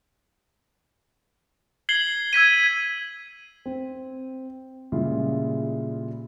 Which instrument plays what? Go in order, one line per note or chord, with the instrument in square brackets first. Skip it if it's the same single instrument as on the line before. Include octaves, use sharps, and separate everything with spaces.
[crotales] G#6 C7 F#7 G7
E6 G#6 B6 D#7
[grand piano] C4
A#2 C#3 G3 G#3 E4 F4